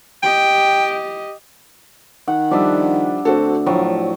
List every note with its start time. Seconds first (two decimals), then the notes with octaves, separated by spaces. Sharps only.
0.23 G4 D#5 G5
2.28 D#3 F#5
2.51 F3 G3 D4 E5
3.25 D2 C4 F#4 A4
3.66 A2 F3 F#3